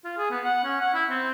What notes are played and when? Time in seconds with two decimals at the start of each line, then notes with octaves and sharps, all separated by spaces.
0.04 F4
0.17 G#4
0.30 B3
0.44 F#5
0.64 C#4
0.81 F#5
0.94 E4
1.10 C4